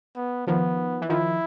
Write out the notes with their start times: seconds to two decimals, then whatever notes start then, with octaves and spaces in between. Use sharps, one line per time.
0.16 B3
0.47 D#3 F3 B3
1.01 E3
1.09 D#3 F3 E4